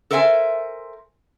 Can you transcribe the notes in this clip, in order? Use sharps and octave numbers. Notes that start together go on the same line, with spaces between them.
A4 A#4 C5 E5 F#5 G#5